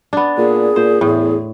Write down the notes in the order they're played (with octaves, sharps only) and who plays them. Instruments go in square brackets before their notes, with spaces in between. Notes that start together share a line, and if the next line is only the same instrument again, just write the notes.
[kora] B3 D4
[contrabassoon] A#2 [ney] G#4
[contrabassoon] A#2 [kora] C5
[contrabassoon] E2 [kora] A2